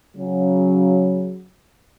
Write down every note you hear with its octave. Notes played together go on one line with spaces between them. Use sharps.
C#3 F#3